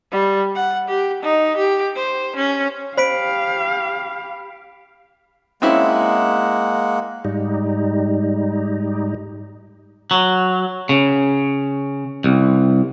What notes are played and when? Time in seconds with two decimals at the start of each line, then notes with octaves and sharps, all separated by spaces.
0.12 G3
0.55 F#5
0.89 G4
1.23 D#4
1.57 G4
1.96 C5
2.36 C#4
2.98 G4 C5 F5 B5 B6 D7
5.62 G#3 A#3 C4 C#4 E4 F#5
7.25 G#2 G3 D#4
10.11 F#3
10.89 C#3
12.24 C2